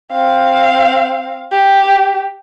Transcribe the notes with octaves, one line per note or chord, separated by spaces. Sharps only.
C4 F5
G4